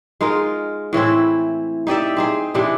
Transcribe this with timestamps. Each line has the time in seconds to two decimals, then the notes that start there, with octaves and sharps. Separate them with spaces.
0.21 G#3 D#4 F4 A#4
0.93 A2 E3 C4 E4
1.87 D#4 G4 D5 E5
2.17 C4 D#4 G#4
2.54 C3 E3 D4